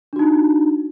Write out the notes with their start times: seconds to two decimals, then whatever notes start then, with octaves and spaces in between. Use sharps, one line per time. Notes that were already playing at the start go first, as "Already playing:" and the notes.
0.13 D4
0.16 F#4
0.19 D#4